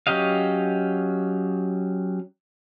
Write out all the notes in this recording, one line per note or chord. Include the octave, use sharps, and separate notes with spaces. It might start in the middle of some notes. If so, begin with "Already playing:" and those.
F#3 C#4 G4 D#5 F5